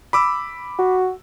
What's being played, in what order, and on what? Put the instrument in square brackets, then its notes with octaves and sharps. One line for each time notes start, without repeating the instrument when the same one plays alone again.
[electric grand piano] B5 D6 E6
[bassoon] F#4